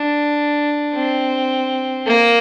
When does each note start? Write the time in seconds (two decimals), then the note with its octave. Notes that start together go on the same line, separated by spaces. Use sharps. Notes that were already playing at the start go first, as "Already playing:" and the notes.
Already playing: D4
0.94 C4
2.06 A#3